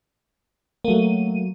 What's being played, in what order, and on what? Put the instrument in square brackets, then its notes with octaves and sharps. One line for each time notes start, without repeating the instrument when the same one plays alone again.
[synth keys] F#3 D#7 [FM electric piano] A3 A#3